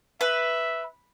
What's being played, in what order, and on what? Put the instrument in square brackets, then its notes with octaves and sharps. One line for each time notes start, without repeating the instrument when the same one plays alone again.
[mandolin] B4 [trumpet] E5